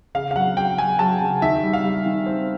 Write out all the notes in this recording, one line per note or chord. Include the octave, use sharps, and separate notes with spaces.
C#3 F5
F5
F#3 F#5
F#3 G5
F#3 G#5
F#3 A5
C#3
D#3 E5
G3
F5
G3
D#3
C4